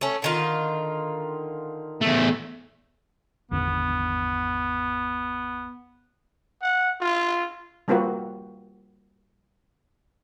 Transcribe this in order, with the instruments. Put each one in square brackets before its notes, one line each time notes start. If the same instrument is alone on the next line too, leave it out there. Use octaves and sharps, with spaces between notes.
[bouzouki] A3 C#4
D3 D#3 F4
[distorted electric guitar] E2 A3
[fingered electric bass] G#1 E2 D3 [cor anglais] B3
[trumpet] F#5
F4
[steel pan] G3 A#3 C4 F4 F#4 B4